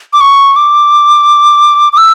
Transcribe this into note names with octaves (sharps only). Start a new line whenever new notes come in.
D6
C#6
D6
D6
E6